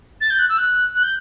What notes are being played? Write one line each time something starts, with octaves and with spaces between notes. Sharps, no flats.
A6
G6
F#6
E6
F#6
F#6
G6